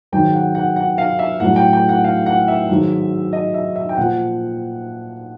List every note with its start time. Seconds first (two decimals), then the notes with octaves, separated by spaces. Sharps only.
0.12 G#2 D#3 F#3 G5
0.33 F#5
0.55 F#5
0.76 F#5
0.98 F5
1.19 E5
1.40 A2 F#3 F#5
1.56 G5
1.73 G5
1.89 F#5
2.04 F5
2.26 F#5
2.48 E5
2.69 G#2 D#3 F#3
3.33 D#5
3.54 E5
3.76 E5
3.89 G5
3.97 A#2 F3 F#5